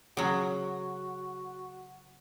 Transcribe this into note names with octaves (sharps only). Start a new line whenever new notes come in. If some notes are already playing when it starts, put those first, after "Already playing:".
C#3 F#3 F#4